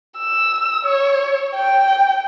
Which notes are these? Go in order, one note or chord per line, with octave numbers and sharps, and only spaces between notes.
E6
C#5
G5